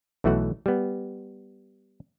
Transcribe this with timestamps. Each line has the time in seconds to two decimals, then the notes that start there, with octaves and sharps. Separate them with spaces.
0.24 B1 E3 A3 F#4 F#5
0.66 G3 B3